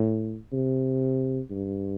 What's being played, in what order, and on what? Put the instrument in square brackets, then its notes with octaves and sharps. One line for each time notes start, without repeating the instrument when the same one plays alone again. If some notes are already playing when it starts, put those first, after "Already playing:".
Already playing: [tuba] A2
C3
G2